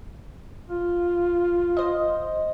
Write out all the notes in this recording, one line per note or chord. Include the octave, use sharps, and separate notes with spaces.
F4
C5 D#5